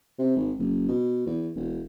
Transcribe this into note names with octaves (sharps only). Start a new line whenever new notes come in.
C3
G#1
F#1
B2
E2
E1